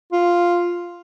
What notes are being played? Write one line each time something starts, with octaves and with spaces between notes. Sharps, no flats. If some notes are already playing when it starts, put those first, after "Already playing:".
F4